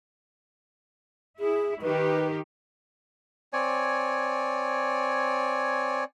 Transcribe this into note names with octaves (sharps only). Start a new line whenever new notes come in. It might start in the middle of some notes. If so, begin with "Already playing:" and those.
E4 G#4
D#3 D#4 G4 B4
C4 C#5 D5 G#5